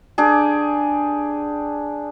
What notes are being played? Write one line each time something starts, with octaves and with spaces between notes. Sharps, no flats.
D4 G4 G#4